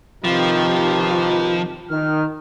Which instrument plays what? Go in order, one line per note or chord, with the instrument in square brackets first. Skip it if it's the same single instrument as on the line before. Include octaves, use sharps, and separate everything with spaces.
[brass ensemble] C3 D#3 [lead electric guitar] F3 [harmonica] F4 G4 B4
[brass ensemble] D#3 [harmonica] F6